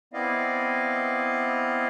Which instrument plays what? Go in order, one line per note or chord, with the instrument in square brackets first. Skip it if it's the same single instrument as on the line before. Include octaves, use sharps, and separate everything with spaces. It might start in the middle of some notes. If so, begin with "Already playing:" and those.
[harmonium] B3 C4 E4 D5 D#5 F5